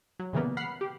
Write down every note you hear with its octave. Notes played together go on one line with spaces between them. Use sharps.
F#3
A#2 C#3 E3 G3 A#3 B3
F#5 B5 F6 C7
G4